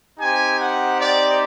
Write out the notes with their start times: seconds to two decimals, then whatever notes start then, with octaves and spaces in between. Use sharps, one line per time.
0.18 C4 D#4 G4 G#5
0.58 F#5
0.97 D5